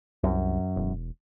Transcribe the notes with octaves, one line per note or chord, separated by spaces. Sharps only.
C2 F#2
E1